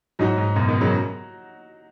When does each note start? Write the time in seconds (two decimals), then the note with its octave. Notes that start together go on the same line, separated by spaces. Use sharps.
0.19 G#2 F#3 D#4 F#4
0.38 G#2
0.56 F#2 B2
0.68 B2 D#3
0.80 C#3 F#3